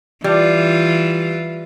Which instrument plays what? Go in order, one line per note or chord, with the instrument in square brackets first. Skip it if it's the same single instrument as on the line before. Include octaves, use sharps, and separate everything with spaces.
[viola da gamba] E3 F4 [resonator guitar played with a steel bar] G3